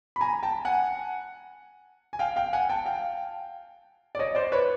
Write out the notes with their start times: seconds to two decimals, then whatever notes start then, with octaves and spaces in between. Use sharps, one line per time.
0.16 B5
0.21 G#5 A#5
0.43 G5 A5
0.65 F#5 G#5
2.13 G#5
2.19 F5 G5
2.36 F5 G5
2.53 F#5 G#5
2.69 G5 A5
2.85 F5 G5
4.15 D5
4.19 C#5 D#5
4.35 C5 D5
4.52 B4 C#5